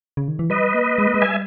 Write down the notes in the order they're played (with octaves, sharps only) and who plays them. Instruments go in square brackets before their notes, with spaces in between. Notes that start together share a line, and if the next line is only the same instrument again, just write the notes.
[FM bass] C#3
D#3
E3
[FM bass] G3 [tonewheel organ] B4 D#5
[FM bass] A#3
G#3
A#3
G#3
[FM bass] G3 [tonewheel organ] E5 G#5